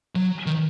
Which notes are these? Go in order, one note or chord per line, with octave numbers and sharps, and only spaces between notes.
F#3
D#3